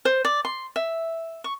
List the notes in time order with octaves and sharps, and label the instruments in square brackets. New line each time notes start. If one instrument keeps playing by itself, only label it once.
[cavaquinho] C5
D5
C6
E5
C#6